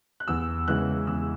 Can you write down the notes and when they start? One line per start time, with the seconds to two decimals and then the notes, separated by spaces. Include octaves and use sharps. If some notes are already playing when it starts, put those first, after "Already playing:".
0.20 F#6
0.28 E2 E6
0.68 C#3 E3 G#3 F#6
1.07 E2 E6